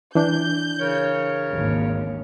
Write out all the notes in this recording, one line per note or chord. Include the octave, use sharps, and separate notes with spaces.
E3 D4 G6
C#3 A#4 C#5
G#1 D#2